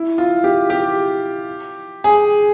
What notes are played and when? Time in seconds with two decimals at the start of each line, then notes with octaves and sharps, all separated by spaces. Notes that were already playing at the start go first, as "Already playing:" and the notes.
Already playing: E4
0.18 F4
0.44 G4
0.70 G4
2.04 G#4